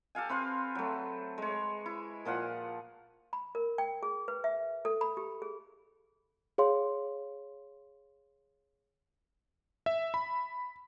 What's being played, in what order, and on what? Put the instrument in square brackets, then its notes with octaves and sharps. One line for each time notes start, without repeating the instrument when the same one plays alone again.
[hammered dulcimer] G4 A4 F5 G#5
C4 B4 F5 C6
F#3 A3
G#3 C#5
E4
A#2 F3 F5 F#5
[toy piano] B5
A#4
G5
G#4
B4
E5
A4
B5
G4
G#4
[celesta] G#4 C#5 F5 C6
[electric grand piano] E5
B5